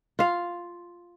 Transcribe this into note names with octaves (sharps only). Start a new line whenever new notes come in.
F4 F5